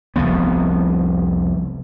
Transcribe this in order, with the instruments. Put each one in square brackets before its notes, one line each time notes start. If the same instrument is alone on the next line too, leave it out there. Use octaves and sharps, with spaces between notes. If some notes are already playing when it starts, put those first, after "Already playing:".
[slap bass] F1 C2 F3 B3